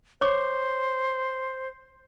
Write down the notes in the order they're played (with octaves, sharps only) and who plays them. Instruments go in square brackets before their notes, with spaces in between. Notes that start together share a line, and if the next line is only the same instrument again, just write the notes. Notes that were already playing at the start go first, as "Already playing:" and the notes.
[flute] C5 [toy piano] C#5 C#6 D6